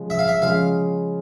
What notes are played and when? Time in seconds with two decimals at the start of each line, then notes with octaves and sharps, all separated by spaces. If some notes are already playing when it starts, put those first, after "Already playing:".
Already playing: C#3 F3 G#3
0.10 E5
0.19 F5
0.28 E5
0.42 C#3 F3 G#3 F5